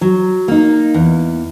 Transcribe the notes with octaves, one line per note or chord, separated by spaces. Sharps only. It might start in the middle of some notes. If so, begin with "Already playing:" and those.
F#3
A#3 D#4
E2